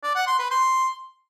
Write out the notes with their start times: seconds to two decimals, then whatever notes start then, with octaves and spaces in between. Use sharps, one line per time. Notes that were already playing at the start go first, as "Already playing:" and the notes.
0.03 D5
0.15 F#5
0.27 C6
0.39 B4
0.51 C6